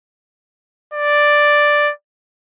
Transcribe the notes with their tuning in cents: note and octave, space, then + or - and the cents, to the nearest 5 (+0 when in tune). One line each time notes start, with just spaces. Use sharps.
D5 +5